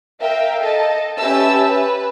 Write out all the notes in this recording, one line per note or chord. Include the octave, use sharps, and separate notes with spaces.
A#4 E5 F5 G5
A4 D#5 A5
C#4 G4 B4 E5 A5 E6
B4